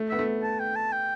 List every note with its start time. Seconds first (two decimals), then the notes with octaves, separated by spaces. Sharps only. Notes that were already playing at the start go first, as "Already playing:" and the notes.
Already playing: A3
0.10 B3 E5
0.19 A3
0.43 A5
0.60 G5
0.76 A5
0.92 G5